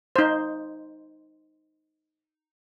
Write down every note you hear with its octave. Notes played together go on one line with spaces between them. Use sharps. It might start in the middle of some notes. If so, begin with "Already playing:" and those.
D#4 C5